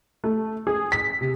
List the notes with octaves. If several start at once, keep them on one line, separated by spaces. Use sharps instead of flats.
A3
G#4
B6
C3